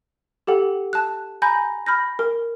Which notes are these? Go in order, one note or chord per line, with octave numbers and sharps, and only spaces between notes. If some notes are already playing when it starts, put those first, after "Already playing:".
G4 A4 F#5 G5
A5 F#6
G#5 A#5 B5 G6 A#6
B5 F6 G6 A#6
A#4